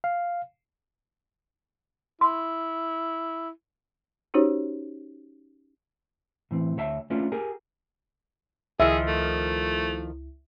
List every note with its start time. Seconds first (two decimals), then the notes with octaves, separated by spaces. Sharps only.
0.04 F5
2.21 E4 C6
4.34 C#4 D#4 F#4 G4 C5 C#5
6.51 A2 E3 C4
6.77 D2 C#5 E5 A5
7.10 A3 A#3 C#4 D4 F4 B4
7.32 G4 G#4 A#4
8.80 C#2 D#3 F3 E4 G#4 E5
9.07 A3